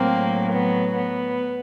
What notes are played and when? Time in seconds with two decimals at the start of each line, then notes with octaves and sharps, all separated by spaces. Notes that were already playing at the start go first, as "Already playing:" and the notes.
Already playing: A2 F#3 A#3 C4
0.53 B3
0.94 B3